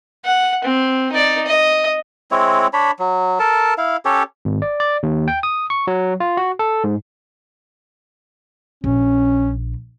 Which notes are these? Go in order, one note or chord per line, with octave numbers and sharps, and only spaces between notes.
F#5
C4
D#4 D5
D#5
G#3 C4 E4 C#5
D4 C#5 B5
F#3
A4 A#4 A5
E4 F5
C#4 G4 A4 C#5
G#1
D5
D5
D#2
G5
D#6
C#6
F#3
F4
F#4
A4
G#2
A#1 C#4